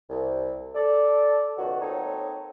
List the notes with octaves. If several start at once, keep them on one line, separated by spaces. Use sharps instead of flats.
C2
A4 D5
C#2 B2 D#3 F#4
F#3 A#3 C4 D#4 A4 C#5